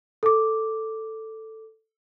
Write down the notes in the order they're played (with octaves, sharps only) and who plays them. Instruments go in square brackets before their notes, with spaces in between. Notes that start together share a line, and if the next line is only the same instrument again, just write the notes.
[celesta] A4 D6